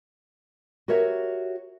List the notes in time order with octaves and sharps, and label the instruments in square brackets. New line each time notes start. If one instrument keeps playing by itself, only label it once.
[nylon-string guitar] F#4 G4 A#4 C#5 E5